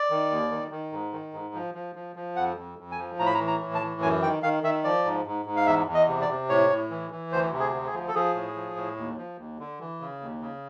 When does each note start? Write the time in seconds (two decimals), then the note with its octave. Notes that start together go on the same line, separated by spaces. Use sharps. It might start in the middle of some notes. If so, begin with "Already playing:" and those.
Already playing: D5
0.10 D#3
0.30 D#2
0.51 D#3
0.71 D#3
0.92 G#2
1.12 D#3
1.33 G#2
1.54 F3
1.75 F3
1.95 F3
2.16 F3
2.36 F2 F#5
2.57 F2
2.79 F2
2.92 G#5
2.99 F3
3.19 A2 A#5
3.26 B5
3.34 A#5
3.39 E3
3.47 A#5
3.61 A2
3.75 A5
3.81 E3
4.02 F#2 G#5
4.22 D#3 G5
4.43 D#3 F5
4.63 D#3 E5
4.84 F3 D5
5.05 G#2
5.26 G#2
5.46 G#2
5.56 F5
5.66 E2 E5
5.87 E2
5.94 D#5
6.08 C3
6.21 D5
6.29 C3
6.49 A2 C#5
6.70 A2
6.90 E3
7.11 E3
7.32 D2 C5
7.52 C3
7.60 G#4
7.73 D2
7.87 G#4
7.94 F3
8.08 A4
8.14 F3 G#4
8.35 A2
8.55 F3
8.76 A2
8.97 D#2
9.17 F3
9.38 D#2
9.59 D3
9.80 E3
10.00 C#3
10.21 D#2
10.41 C#3